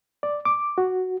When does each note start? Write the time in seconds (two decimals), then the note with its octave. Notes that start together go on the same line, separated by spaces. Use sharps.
0.23 D5
0.45 D6
0.78 F#4